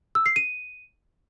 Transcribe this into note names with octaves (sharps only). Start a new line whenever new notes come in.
E6
C7
D#7